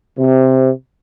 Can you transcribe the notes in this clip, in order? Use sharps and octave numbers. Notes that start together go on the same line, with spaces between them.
C3